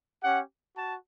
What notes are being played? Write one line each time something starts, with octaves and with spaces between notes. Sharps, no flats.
C#4 G4 F#5
F#4 A5